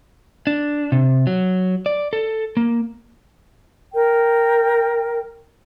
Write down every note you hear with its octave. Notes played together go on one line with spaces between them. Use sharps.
D4
C3
F#3
D5
A4
A#3
A#4 G5